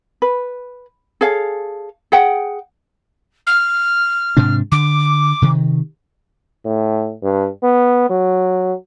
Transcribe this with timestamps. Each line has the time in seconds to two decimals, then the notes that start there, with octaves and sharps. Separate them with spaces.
0.22 B4
1.21 G#4 A4 C#5 F5
2.12 G#4 F#5 G5
3.47 F6
4.37 G#2 C3 D4
4.72 D3 D6
5.42 C3 D#3
6.65 A2
7.23 G2
7.63 B3
8.10 F#3